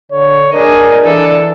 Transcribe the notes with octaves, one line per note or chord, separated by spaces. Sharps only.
D3 C#5
D4 G#4 A#4 D#5
E3 D4 A4